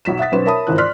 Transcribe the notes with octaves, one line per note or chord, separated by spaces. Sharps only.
B1 F#3 B6 E7
E5 F#5 D#6 A6 B6
B1 C#4 B4 C5 E7
A#4 C#5 E5 A5 B5 D#6
G#1 C#2 E3 A#4 F#6
D5 C6 F6 F#6 B6